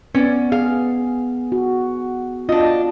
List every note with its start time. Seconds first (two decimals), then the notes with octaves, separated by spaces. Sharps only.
0.15 B3 C#4 D5
0.52 G#4 F5
1.52 F#4
2.49 D4 F4 D#5